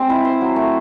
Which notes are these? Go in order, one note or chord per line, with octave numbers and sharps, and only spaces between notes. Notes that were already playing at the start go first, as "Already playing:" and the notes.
Already playing: G#3 C4
E4
C5
F#3
A3